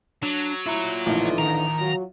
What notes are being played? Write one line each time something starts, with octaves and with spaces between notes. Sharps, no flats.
F#3 D4
E4 F4 A#5
A#1 A2 D3 E3 D#4
D#3 A#5
F#3 F4 F#4